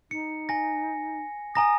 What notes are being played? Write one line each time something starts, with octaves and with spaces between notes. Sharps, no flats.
D#4 C#7
G#5 A#6
G#5 A#5 D#6 A#6